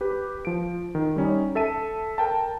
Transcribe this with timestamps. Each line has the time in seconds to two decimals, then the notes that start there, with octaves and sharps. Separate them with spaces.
0.01 G4 B4
0.45 F3 D7
0.95 D#3
1.16 G3 C#4 D#4
1.55 A4 E5 A5 D#7
2.18 A#4 G5 A5